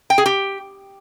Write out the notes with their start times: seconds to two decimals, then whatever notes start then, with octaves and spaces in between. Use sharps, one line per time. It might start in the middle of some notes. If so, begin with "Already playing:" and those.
0.10 G5
0.18 G#4
0.26 G4